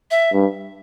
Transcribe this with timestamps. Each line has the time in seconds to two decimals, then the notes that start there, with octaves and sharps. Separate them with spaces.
0.11 E5
0.33 G2